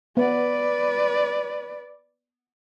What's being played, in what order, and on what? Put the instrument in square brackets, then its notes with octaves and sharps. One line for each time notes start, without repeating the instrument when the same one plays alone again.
[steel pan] B3 [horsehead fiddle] B4 D5